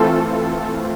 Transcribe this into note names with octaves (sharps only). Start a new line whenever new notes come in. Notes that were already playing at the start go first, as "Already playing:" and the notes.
Already playing: E3 A3 C4 F4 A4